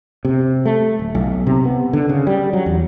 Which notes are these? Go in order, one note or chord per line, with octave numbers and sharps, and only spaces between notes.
C3
A3
D1
B1
C3
B3
D3
C#3
G3
F#3
E2